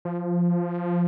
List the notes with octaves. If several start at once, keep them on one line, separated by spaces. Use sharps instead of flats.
F3